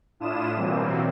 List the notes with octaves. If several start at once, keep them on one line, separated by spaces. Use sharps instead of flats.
A2 D4 E4 F4 D#6 E7
B2 E3 F#3 G3 A#3 C4